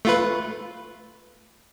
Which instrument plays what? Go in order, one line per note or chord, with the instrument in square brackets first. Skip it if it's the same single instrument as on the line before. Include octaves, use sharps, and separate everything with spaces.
[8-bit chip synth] A3 F4 B4